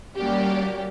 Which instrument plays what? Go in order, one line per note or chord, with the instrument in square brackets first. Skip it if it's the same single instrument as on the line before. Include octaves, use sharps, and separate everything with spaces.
[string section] G3 A#3 C#4 F#4 G4 D5